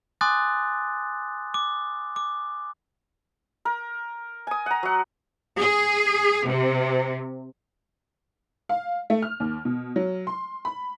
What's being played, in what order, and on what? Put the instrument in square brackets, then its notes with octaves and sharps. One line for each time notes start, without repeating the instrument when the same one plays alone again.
[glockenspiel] G#5 C6 D6 D#6 F#6 A6
D6
D6
[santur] A#4
G#5 D#6
F#5 A#5
F#3 F#5
[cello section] G#4
C3
[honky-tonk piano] F5
A3
F6
D#2
B2
F#3
C6
B5